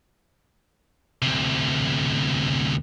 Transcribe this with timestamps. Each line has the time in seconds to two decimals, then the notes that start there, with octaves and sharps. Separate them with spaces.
1.22 D2 C3